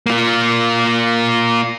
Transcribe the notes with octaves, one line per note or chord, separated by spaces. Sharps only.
A#3 F4